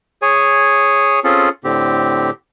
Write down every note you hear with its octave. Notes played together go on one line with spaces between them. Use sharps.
G#4 C#5 G#5
C4 C#4 F4 G#4 A4
A2 D3 C4 G4